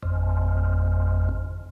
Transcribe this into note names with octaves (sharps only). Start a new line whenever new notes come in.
G#1 F2